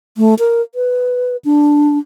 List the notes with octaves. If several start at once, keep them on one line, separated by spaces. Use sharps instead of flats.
A3
A#4
B4
D4